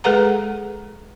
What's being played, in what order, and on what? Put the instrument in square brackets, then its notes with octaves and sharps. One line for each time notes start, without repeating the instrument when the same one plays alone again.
[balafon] G#3 G#4 A4 B4 F#5 A#5